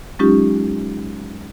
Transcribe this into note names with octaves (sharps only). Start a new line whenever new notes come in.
F#3 G#3 C#4 D#4 F4 G4